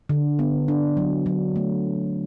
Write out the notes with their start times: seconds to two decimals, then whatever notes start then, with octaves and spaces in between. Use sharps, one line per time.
0.09 D3
0.39 B3
0.68 D4
0.97 F#3
1.26 F#3
1.56 A3